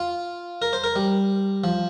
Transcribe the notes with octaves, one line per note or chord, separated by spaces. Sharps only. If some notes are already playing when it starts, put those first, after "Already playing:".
Already playing: F4
A#4
C5
A#4
G3
F3